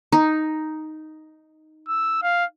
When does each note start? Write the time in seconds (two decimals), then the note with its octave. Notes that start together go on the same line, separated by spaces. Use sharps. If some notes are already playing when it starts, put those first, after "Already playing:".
0.12 D#4
1.88 E6
2.23 F5